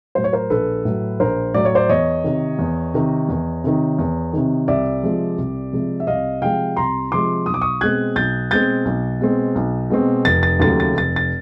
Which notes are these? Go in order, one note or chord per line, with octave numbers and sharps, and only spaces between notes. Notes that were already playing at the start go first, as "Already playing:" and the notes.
A2 F#3 C5
C#5
A#4 C5
A#1 A4 B4
A2 F#3
A#1 A#4 C5
A2 F#3 D5
C#5
C5 D5
E2 C#5 D#5
C3 D#3
E2
C3 D#3
E2
C3 D#3
E2
C3 D#3
C2 D5 E5
C3 F3 G#3
C2
C3 F3 G#3
E5
C2 D#5 F5
C3 F3 G#3 F5 G5
C2 A#5 C6
C3 F3 G#3 C6 D6
B1 D#6
D6
C#6 D#6
B2 G#3 C4 F#6 G#6
B1 G6 A6
B2 G#3 C4 G6 A6
B1
B2 G#3 C4
B1
B2 G#3 C4
F1 A6
A6
D#2 C#3 F#3 A3 A6
A6
F1 A6
A6